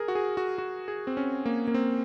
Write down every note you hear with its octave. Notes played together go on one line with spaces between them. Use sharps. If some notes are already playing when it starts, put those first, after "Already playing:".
Already playing: G#4 A#4
F#4
G#4
F#4
F#4
G#4
C4
C#4
A#3
A#3
C4